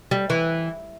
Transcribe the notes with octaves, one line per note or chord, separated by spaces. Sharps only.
G3
E3